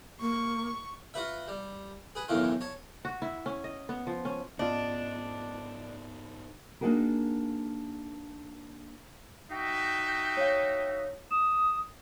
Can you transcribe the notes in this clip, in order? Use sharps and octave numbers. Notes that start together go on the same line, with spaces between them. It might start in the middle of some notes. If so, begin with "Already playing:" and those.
A#3 C#6
F4 F#4 B4 E5
G3
G#4 B4
B1 E2 A2 D#3 E3 F4
C#5 A5
F#4
E4
C#4
D#5
B3
F3
C#4
G#2 B3 C#4 D4 F4 D5 D#5
A#3 D4 D#4 F#4 G#4 A#4
D#4 F#4 E5 G5
C#5 F5
D#6 E7